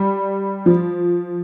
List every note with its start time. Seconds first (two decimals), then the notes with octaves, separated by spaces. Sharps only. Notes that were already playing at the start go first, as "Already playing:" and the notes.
Already playing: G3
0.66 F3